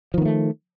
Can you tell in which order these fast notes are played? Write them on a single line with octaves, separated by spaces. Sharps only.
F3 D#3 B3 A3